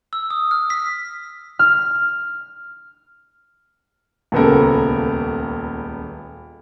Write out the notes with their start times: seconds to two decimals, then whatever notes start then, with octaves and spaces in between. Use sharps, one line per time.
0.13 E6
0.30 D#6
0.51 F6
0.70 B6
1.59 F6
4.32 D#1 C#2 B3 A4 A#4